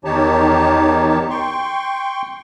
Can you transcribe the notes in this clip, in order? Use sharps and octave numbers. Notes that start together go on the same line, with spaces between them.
E2 D#3 D#4 G4 C#5 A5
G5 C6 C#6